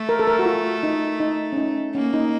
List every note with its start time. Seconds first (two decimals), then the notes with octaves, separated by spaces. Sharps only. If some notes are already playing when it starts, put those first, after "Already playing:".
Already playing: A3
0.09 A#4
0.19 A4
0.27 A#4
0.39 F#4
0.46 F4
0.83 D#4
1.20 D#4
1.53 C#4
1.57 D#4
1.95 A#3 C#4
2.14 D#4